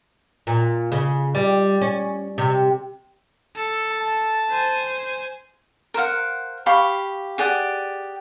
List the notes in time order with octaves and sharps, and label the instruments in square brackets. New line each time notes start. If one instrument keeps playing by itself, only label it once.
[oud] A#2
C#3
G3
C#4
C3
[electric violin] A4
[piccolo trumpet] A5
[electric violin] C5 G#5
[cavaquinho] A#4 C5 F5 F#5
G4 F5 B5 C#6
G4 G#4 D5 F#5